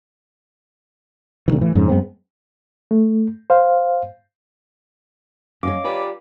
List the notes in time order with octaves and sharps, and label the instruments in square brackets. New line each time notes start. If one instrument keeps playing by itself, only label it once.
[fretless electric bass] D2 C3 D#3 E3
A2 E3
F2 G#2 C#3
F#2 G#3 B3 C4
[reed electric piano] A3
C5 F5
[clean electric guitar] F#2 [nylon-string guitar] C#5 D#5 F5 [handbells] D6
[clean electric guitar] F4 G4 D5 [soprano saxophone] B4